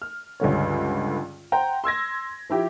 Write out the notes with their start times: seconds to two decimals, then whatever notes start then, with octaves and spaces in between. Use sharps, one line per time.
0.02 F6
0.40 C#2 G2 D3 C#5
1.52 C5 F#5 G5 A#5
1.84 C6 E6 G#6 A#6
2.50 F3 E4 G4